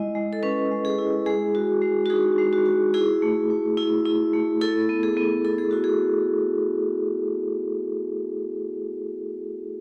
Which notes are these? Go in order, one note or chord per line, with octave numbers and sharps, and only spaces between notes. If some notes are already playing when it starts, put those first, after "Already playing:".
Already playing: G#3 E4 D#5
G#3
A4
C#4 B4
G#3
G#4
E4
G#3 G#4
F#4
G#3
F#4
D#4 G#4
G#3
F#4
F#4
E4 G#4
A3
A3
E4
E4
A3
E4 A4
B3
G#4
B3
E4 A4
G#4
E4 F#4
G#4